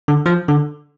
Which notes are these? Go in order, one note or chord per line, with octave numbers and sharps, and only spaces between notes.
D3
F3
D3